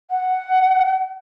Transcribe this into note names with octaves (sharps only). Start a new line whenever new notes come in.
F#5